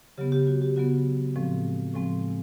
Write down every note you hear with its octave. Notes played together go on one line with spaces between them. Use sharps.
C#3 F#3 B3 G4
G4
F#4
G4
C#3 F#3 B3 F#4
A2 F3 G#3 C4
A2 F3 G#3 C4